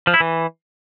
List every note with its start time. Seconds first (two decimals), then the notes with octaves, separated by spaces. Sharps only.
0.07 F3
0.14 E4
0.20 E3